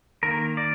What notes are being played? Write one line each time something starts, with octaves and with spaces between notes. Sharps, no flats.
D#3 A#3 A#4
D5